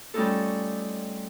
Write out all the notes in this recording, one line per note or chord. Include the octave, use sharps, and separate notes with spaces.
G3 A3 C#4 D#4 F4 A4